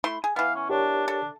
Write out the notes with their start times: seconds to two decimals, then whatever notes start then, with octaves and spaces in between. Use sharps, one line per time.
0.04 A3 E4 C6
0.24 G#4
0.36 E3 B3 F5
0.55 C#4
0.70 D4 G4 A#4 C#5
1.08 D4 A4